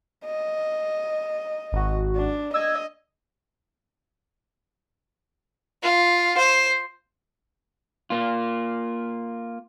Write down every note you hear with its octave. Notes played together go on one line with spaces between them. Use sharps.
D#5
G#1 F#4
D4
D#5 E6 G#6
F4
C5
A#3 F4